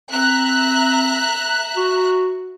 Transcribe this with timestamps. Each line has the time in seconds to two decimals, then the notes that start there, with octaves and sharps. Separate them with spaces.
0.11 C4 E5 A#5 F#6
1.77 F#4